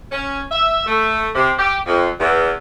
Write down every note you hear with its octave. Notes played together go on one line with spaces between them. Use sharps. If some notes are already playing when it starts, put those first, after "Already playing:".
C#4
E5
A3
C3
G4
F2
E2